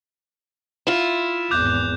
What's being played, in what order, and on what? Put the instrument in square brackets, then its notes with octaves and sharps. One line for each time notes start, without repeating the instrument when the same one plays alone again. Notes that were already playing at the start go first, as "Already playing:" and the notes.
[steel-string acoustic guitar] E4 F4 [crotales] E7
[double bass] G#1 E2 [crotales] D6 F#6 G6